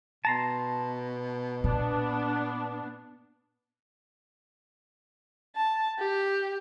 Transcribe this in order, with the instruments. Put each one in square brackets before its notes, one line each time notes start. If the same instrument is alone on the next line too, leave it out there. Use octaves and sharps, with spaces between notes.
[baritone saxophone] B2 [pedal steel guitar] A5 A#5 C6
[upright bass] A#2 [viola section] B3 D4
[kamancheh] A5
G4